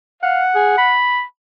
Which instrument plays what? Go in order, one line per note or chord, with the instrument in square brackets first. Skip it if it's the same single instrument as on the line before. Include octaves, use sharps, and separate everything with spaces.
[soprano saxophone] F5 [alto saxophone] F#5
[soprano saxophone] G#4
B5